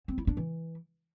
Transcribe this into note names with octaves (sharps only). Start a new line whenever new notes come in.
C4
E4
D4
E3